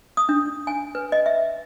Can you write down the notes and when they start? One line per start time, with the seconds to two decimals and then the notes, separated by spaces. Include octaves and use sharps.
0.17 D#6
0.29 D4
0.67 G#5
0.95 B4
1.12 D#5
1.26 E5